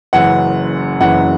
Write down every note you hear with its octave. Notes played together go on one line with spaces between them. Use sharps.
F#1 F#2 E3 F#5
F#1 F#2 E3 F#5